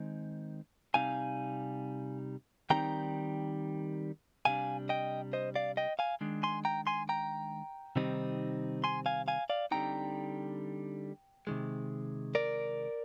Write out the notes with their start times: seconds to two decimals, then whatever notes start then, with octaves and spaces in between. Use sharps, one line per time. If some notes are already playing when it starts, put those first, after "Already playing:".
Already playing: D#3 G#3 C4 D#4
0.94 C3 G3 C4 D#4 F5 G#5
2.70 D#3 G3 C4 D#4 G5 A#5
4.45 C3 G3 D4 F5 G#5
4.89 D#5 G5
5.33 C5 D#5
5.56 D5 F5
5.77 D#5 G5
5.99 F5 G#5
6.21 D#3 G#3 D4
6.43 G#5 C6
6.65 G5 A#5
6.87 G#5 C6
7.09 G5 A#5
7.96 C3 D#3 G3 C4 D#4
8.84 G#5 C6
9.06 F5 G#5
9.28 F5 G#5
9.50 D5 F5
9.71 D3 G3 C4 D#4 G5 A#5
11.47 C3 D#3 G#3
12.35 A#4 D5